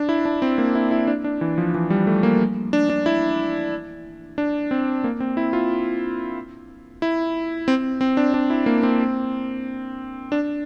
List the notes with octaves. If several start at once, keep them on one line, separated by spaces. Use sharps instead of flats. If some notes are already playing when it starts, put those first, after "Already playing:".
Already playing: D4
E4
D4
C4
A#3
E4
E4
D4
D4
E3
F3
E3
G3
A3
A#3
D4
D4
E4
D4
C4
A#3
C4
E4
F4
E4
C4
C4
D4
D4
E4
A#3
C4
D4